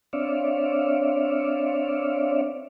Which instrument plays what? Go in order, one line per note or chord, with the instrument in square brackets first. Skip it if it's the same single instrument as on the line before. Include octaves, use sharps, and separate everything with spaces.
[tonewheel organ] C4 D4 C#5 D5 E5 F5